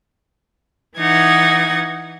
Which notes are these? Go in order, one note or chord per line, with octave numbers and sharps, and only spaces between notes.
E3 D#4 F#5 G#6